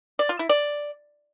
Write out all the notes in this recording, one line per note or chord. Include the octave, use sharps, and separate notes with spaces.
D5
F4
E4
D5